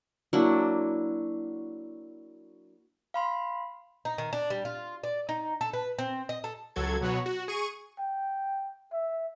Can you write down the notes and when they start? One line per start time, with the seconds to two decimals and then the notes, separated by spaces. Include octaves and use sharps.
0.33 F#3 A#3 D4 E4
3.14 F5 B5 C6
4.05 D#4
4.18 D#3
4.33 D4
4.50 G3
4.65 F4
5.04 D5
5.29 D#4
5.61 A4
5.73 B4
5.99 C4
6.29 D#5
6.44 A4
6.76 C#2 F#3 A4 G#6
7.01 B2 F#3 B3 F#4 C#5
7.26 F#4
7.48 G#4 C#6 D#7
7.99 G5
8.92 E5